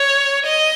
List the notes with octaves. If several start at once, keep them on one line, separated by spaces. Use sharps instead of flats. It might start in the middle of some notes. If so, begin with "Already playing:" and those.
Already playing: C#5
D#5